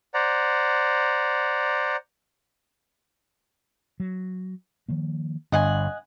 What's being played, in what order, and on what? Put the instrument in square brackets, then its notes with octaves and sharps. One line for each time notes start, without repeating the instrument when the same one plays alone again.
[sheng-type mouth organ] C5 D5 F#5 A#5
[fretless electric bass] F#3
D#3 F3 A#3
[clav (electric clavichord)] G1 [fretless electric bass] D4 [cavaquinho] D#5 F#5 G#5